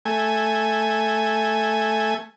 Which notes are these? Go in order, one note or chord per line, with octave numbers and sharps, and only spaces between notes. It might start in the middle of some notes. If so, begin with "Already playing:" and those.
A3 G#5